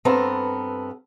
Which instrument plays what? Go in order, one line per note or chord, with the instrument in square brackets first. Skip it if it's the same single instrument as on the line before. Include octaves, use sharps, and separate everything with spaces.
[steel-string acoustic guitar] G2 B3 C4 A4 A5 A#5